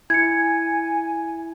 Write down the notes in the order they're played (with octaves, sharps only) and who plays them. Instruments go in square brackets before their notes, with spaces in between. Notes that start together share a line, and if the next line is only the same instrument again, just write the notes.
[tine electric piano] E4 [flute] G#5 [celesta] G#6 C#7